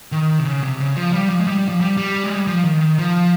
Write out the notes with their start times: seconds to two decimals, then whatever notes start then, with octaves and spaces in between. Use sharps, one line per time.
0.12 D#3
0.40 C3
0.45 C#3
0.63 C3
0.80 C#3
0.96 F3
1.13 G3
1.29 F3
1.41 G#3
1.47 G3
1.58 G3
1.69 F3
1.81 G3
1.97 G3
2.24 G#3
2.35 G3
2.47 F3
2.64 D#3
2.81 D#3
2.98 F3